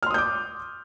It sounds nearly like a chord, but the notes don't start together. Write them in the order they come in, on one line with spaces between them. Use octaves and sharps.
F6 C6 D#6 G6 D6